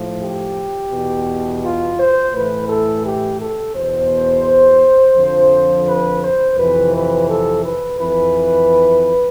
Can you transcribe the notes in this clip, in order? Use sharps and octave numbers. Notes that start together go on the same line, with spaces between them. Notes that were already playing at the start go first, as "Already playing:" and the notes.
Already playing: A2 F3
G4
E2 B2
F4
C5
A2 E3 B4
A4
G4
A4
E2 B2 C5
F2 D3 F3
B4
C5
F2 C3 E3 B4
B4
A4
B4
F2 E3 B4